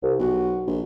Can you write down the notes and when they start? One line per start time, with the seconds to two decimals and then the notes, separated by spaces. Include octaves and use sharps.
0.02 C2
0.19 B1 F#4
0.67 A#1